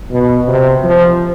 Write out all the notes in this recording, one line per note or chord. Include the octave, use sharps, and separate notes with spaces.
B2
C3
F3